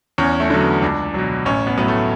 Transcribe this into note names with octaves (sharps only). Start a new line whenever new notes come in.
E2 C#4
A3
D3 F#3
B3
C#2 D4
B2 F#3
A1 C#4
B3
A2 F#3 B3
A3